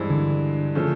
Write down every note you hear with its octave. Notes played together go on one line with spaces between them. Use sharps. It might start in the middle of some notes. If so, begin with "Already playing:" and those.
Already playing: G2 E3 G#3 C4
D3
C#3 F3 A3